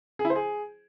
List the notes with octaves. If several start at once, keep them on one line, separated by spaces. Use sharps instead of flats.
G#4
E4
C5
G#4